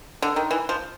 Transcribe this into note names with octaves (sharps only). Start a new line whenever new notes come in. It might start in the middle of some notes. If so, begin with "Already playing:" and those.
D3
D#3
E3
F3